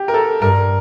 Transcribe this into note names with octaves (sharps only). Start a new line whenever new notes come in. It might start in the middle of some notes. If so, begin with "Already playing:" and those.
Already playing: G4
A#4
A4
G2 A#4